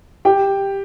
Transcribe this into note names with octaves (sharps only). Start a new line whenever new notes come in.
G4 G5